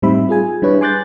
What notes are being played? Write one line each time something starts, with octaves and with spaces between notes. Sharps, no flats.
A2 G3 C4 D#4 E5 B5
F4 G#4 G#5
G3 D4 E4 G#4 B4 C#5
G#5 C6 D6 F#6 G6 A6